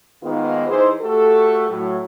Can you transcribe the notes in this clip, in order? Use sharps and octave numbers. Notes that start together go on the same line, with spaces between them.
G#2 D#3 G#3 A#3 B3 F4
E3 D#4 G#4 C5
A3 F#4 G4 A4
A2 F#3